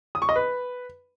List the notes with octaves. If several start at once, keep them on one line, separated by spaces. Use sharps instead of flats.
D#6
C#6
D#5
B4